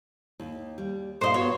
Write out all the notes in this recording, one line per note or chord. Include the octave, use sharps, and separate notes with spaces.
D#2
G3
A#2 D#4 C5 D#5 F5
B3 F#4 C#5